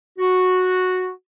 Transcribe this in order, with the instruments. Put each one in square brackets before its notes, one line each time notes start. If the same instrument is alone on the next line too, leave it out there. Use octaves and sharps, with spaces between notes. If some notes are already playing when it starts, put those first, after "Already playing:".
[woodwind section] F#4